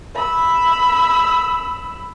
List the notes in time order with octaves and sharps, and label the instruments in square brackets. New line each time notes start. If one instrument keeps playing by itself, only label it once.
[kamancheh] B5 E6